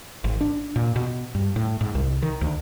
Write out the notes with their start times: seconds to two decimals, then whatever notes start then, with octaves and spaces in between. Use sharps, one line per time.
0.24 G#1
0.41 D4
0.76 A#2
0.96 B2
1.35 G2
1.56 A2
1.81 G#2
1.95 C2
2.22 D#3
2.41 D2